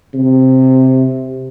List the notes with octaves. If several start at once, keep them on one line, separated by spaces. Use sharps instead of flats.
C3